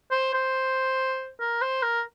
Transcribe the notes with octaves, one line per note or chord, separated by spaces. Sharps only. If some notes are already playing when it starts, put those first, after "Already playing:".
C5
C5
A#4
C5
A#4